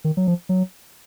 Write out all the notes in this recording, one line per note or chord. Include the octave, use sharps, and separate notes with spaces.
D#3
F#3
F3
F#3